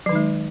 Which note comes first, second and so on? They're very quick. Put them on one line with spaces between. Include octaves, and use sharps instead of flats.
F#3 D#3 D#4 G#3